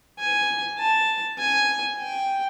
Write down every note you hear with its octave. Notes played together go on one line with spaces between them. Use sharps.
G#5
A5
G#5
G5